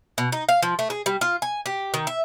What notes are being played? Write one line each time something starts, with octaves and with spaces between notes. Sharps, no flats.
B2
D#4
F5
F3
A3
G#4
G3
F4
G#5
G4
D#3
E5